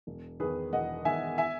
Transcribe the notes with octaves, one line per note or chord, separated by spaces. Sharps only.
E1
E2 D#3 G#4 B4
E1 D#5 F#5
E2 D#3 E5 G#5
E5 G#5